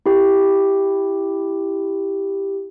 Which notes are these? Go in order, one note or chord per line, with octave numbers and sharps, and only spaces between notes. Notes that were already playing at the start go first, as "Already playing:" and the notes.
E4 G4